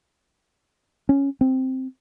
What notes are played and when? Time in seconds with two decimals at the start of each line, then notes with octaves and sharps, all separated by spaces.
1.09 C#4
1.41 C4